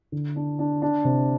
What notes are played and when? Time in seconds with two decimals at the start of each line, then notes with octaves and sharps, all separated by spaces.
0.12 D3
0.36 D4
0.59 D4
0.82 D4
1.05 C3